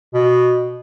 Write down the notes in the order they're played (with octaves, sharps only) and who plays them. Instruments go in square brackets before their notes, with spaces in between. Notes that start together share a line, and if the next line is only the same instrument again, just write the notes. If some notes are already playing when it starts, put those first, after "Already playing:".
[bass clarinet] B2